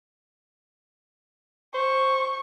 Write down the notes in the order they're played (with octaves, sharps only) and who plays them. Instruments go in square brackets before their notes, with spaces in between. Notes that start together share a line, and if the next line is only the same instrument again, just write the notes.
[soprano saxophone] C5 [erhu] C#6